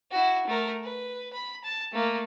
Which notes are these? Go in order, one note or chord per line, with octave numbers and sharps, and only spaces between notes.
E4 F#4
A3 A#4
B4
B5
A5
A3 A#3